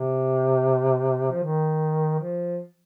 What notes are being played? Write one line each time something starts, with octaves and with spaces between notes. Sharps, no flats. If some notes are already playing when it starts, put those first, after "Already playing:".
Already playing: C3
F3
D#3
F3